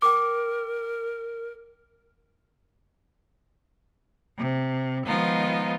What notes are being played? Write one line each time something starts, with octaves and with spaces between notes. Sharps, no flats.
A#4 G5 D6
C3
D#3 F3 G#3 B3 D#4 F4